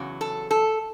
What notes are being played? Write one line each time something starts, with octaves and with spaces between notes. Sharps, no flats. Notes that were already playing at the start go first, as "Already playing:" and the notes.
Already playing: E2 C#3 F#3
A4
A4